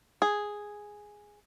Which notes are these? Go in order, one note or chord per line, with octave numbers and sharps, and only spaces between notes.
G#4